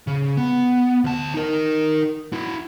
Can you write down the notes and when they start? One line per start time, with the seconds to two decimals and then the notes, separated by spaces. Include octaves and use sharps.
0.07 C#3
0.37 B3
1.04 D2 A5
1.34 D#4 A#4
2.33 E4 F#4